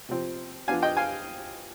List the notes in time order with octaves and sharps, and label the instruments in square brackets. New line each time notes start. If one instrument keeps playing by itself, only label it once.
[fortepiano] C3 F3 C4
F3 B3 D4 F5 G#5
D#5 G5
F5 G#5